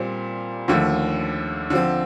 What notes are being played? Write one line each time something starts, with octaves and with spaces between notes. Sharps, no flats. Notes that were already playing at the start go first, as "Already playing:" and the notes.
Already playing: A#2 G3 C4
D#2 D3 F3 A3
D3 F3 C4